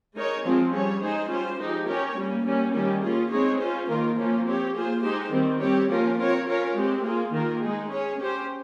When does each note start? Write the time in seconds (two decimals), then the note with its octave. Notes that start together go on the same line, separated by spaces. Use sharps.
0.15 G#3 D#4 A#4 C#5
0.44 F3 G#3 C4 F4 G#4
0.72 G3 C#4 G#4 C#5
1.01 G#3 D#4 G#4 C5
1.30 G3 C#4 F4 C5
1.59 F3 G#3 D#4 G4
1.88 C#4 G4 A#4 C#5
2.16 G3 A#3 C#4
2.44 G3 A#3 C#4
2.73 D#3 G3 A#3 C#4 G4
3.02 A#3 C#4 F4 G#4
3.31 G#3 C4 D#4 G#4 C#5
3.60 C#4 F4 C5
3.88 D#3 A#3 F4 A#4
4.16 F3 A#3 C#4 F4
4.46 C4 G4 C#5
4.75 A#3 F4 G#4 C5
5.02 G#3 D#4 G4 C5
5.31 D#3 G3 C4
5.59 G3 C4 G4 C#5
5.89 F3 A#3 C#4 F4 A#4
6.18 C4 F4 A#4 C#5
6.47 C#4 F4 A#4 C#5
6.74 G#3 C4 G4
7.03 A#3 F4 G#4
7.32 D#3 A#3 F4 A#4
7.60 G#3 D#4 G#4
7.89 C#4 G#4 C#5
8.18 C#4 G4 C5